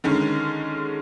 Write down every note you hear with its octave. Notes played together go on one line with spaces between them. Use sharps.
D3 D#3 G#3 C#4